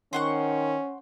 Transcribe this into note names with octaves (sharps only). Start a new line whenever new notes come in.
D#3 C#4 C5 F#5 C#6